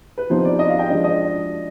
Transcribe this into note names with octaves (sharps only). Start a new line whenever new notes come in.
B4
C3 F3 B3 D#4 C5
D5
D#5
F5
G5
F3 G#3 D4 D#5
D#5